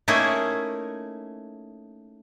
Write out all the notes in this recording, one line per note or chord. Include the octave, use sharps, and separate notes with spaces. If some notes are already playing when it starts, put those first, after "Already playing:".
A3 A#3 C#4 D#4 E4 G#4